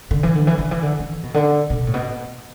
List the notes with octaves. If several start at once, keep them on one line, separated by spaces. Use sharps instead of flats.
D3
E3
D3
E3
D3
E3
D3
E3
B2
D3
B2
A2
B2